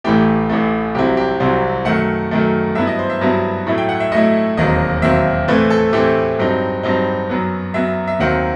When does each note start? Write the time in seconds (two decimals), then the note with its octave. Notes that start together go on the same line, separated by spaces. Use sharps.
0.04 A1 A2 E3 A3 G4
0.49 A1 A2 E3 A3
0.95 C2 C3 F#3 C4 E4 G4
1.17 G4
1.40 C2 C3 F#3 C4 E4 C5
1.85 F#2 D#3 A3 F#5
2.31 F#2 D#3 A3
2.75 G2 F#3 B3 E4 E5
2.87 D#5
2.99 C5
3.10 E5
3.21 G2 F#3 B3 E4
3.67 A2 F#3 A3 E4
3.78 G5
3.89 F#5
4.00 E5
4.12 A2 F#3 A3 E4 D#5
4.57 E1 D#2 D#3 F#3 C4 D#5
5.02 E1 D#2 D#3 F#3 C4 E5
5.48 A2 E3 A3 C4 E4 B4
5.70 A4
5.93 A2 E3 A3 C4 E4 G4
6.39 G2 F#3 C4 D#4
6.83 G2 F#3 C4 D#4
7.29 F#2 F#3 B3
7.74 F#2 F#3 B3 E5
8.08 E5
8.19 D#2 D#3 F#3 C4 F#5